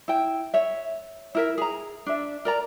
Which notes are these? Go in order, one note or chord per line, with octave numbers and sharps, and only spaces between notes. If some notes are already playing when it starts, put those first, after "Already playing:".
E4 G5
C#5 E5
E4 A#4 E5
G#4 A#5
D4 E5
A#4 D5 A#5